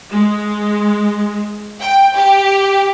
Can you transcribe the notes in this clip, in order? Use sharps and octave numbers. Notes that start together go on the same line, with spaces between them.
G#3
G5
G4